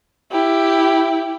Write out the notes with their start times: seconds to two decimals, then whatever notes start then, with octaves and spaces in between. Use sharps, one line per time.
0.32 E4 G4